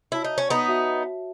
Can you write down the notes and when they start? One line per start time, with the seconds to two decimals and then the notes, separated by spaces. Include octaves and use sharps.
0.12 E4 F#4 C#5 E5 A5
0.24 D#4
0.38 C#4
0.50 B3 D#4
0.68 F#4 C#5 E5 A5